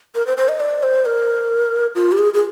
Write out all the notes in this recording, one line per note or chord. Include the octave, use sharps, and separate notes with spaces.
A#4
C5
C5
D#5
D5
C5
A#4
F4
G4
G#4
G#4